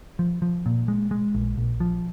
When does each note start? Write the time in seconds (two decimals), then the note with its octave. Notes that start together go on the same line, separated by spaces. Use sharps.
0.19 F3
0.42 F3
0.66 A#2
0.88 G#3
1.11 G#3
1.35 A#1
1.57 A#1
1.80 F3